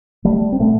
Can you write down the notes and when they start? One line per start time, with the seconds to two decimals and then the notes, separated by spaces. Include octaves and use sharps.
0.25 G3 A3
0.52 C4
0.59 A#2 A3 B3